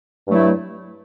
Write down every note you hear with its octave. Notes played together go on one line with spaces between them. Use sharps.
G2 F#3 A3 E4